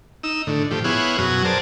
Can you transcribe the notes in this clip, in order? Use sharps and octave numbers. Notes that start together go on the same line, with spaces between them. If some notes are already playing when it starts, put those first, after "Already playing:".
D#4 E6
A2 D3
A2 F3 G4
B3 E4 G#4 C#5 F5 F#5
F#2 B2 F#3 F#4 G#5
G#4 A#4 C5 D5 F#5 A5